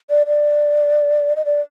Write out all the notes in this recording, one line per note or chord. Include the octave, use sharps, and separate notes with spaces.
D5
D5
D#5
D5